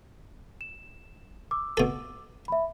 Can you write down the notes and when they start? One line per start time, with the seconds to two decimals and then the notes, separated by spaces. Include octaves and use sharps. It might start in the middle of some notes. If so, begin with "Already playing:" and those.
0.61 E7
1.51 D6 E6
1.77 B2 A4
2.48 E5 B5